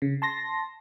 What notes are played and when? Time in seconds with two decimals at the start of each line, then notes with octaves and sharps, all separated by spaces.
0.02 C#3
0.22 A5 C6 A#6